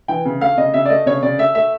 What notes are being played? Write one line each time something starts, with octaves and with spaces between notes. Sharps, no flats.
E3 G5
C#3
A3 F5
C#3 D#5
C#3 E5
D5
A3 D#5
C#3 C#5
C#3 D5
A3 E5
A3 E5